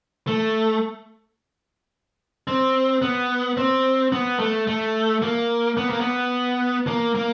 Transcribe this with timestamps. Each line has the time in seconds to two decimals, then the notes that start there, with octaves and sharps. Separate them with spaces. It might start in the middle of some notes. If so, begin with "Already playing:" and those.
0.27 A3
2.47 C4
3.02 B3
3.57 C4
4.12 B3
4.39 A3
4.67 A3
5.22 A#3
5.77 B3
5.90 A#3
6.00 B3
6.87 A#3
7.15 A#3